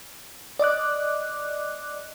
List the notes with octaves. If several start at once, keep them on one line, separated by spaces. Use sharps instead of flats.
D5 D#5 D6 F#6